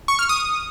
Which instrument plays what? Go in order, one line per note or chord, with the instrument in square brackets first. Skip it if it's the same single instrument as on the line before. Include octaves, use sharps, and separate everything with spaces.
[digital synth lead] C#6
F6
D#6